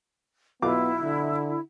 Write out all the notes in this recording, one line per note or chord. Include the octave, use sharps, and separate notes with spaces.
B1 B3 E4 F4 D6
D3